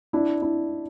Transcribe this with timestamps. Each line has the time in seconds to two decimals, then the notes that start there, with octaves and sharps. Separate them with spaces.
0.13 D4 E4
0.42 D4 E4